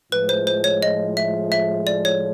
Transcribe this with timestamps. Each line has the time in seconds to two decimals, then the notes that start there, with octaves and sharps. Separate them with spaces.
0.12 A2 F3 G#3 B4
0.29 C5
0.47 C5
0.64 C#5
0.83 D#5
1.17 E5
1.52 E5
1.87 D5
2.05 C#5